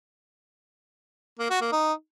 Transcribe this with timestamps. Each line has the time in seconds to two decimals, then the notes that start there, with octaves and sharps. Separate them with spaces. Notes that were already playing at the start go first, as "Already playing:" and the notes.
1.39 A#3
1.50 F#4
1.61 A#3
1.72 D#4